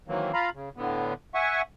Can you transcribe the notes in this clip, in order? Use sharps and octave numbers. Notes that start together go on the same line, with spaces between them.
D#3 E3 F#3 A#3 C4
F4 F5 A#5 B5
C#3
A2 D3 B3
E5 F#5 G#5 C#6